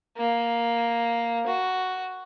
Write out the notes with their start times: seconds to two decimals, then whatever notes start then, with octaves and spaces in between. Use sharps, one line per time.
0.17 A#3
1.47 F#4